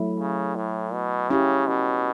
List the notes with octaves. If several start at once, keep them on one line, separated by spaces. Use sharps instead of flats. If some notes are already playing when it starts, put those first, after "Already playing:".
Already playing: F#3 A3 E4
C#3
A2
B2
C#3 C#4 E4 G4
B2